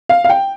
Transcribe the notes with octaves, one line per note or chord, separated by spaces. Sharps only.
F5
F5
G5